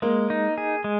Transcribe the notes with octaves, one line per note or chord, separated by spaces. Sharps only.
G#3 A#3
D#4
G#4
G#3